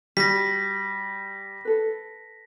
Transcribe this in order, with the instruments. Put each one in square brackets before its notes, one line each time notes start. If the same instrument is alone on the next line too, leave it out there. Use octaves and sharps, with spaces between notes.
[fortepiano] G3 [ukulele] F#4 [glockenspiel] A#6 B6
[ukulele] A4 B4